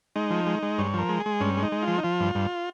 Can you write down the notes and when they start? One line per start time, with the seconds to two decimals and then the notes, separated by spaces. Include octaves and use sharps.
0.16 G#3 D#4
0.30 F3
0.47 G#3
0.63 G#3
0.78 G2 C#5
0.94 F3 A#4
1.09 G#3
1.20 G#4
1.26 G#3
1.40 G2 C#4
1.57 G#3
1.63 D#4
1.72 G#3
1.82 F4
1.88 F3
1.98 D#4
2.03 F3 F4
2.20 G2
2.35 G2